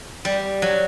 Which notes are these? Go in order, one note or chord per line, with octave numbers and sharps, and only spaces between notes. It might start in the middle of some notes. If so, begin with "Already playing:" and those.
G3
F#3